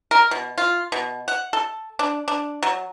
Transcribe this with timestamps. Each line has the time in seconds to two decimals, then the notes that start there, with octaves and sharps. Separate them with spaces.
0.11 A#4
0.31 B2
0.58 F4
0.92 B2
1.28 F#5
1.53 A4
1.99 D4
2.28 D4
2.63 F#3